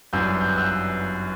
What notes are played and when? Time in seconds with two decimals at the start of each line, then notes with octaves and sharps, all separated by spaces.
0.13 G1 F#2 E3 G3 E6 G6
0.41 G6
0.49 F#6
0.58 E6 G6